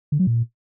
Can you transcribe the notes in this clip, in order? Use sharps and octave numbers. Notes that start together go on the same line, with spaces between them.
D3
F#3
A#2